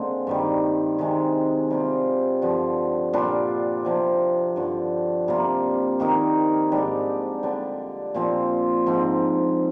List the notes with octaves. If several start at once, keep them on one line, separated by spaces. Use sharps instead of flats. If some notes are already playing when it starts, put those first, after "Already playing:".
Already playing: D3 G#3 A#3 C4
G2 D#3 G3
C3 D#3 G#3
C3 G3 C4 F4
G2 D3 F3
A#2 G3 D4 F4
C3 F3 C4
G2 D3 F3
C3 G3 A#3 F4
D#3 A#3 D#4 A#4
G#2 G3 D4 G4
D3 G3 D4
A#2 F3 C4 F4
G#2 F3 C4